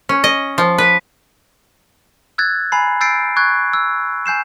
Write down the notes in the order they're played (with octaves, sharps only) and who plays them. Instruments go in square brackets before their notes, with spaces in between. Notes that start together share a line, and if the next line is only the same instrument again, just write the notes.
[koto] C#4
D#5
F3
B4
[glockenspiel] E6 F#6 G#6 A6
G#5 A#5 B5 C7
E6 G6 A6 C7 D7
C#6 F#6 G#6
E6
G#5 G6 C7 E7